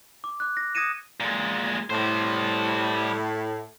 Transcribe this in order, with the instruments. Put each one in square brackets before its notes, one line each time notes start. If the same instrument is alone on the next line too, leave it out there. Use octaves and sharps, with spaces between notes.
[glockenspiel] D6
D6 F#6
A#6
D#6 G#6 A#6 C#7 D#7 E7
[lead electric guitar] A#2 G#3
[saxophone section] A2 [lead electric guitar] G3 C5